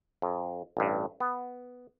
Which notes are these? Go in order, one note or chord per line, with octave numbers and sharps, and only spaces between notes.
F2
A1 G2
B3